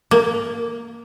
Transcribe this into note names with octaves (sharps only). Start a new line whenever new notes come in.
A#3